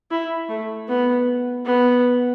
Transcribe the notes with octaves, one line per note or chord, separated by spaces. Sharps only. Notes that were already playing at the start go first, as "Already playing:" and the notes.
E4
A3
B3
B3